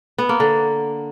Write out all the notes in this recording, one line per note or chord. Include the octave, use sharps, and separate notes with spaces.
B3
A#3
D3